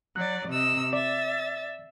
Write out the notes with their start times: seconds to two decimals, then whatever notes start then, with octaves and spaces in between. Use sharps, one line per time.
0.16 F#3 D5 F#6
0.48 C3 D#5 E6
0.93 D5 E5 A6